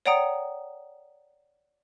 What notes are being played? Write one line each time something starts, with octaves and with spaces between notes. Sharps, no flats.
C#5 D5 F#5 G5 A#5 D#6